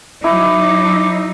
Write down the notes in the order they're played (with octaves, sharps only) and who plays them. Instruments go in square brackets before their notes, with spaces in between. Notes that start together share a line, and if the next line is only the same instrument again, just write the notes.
[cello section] F#3 D#4 [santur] E4 [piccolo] D6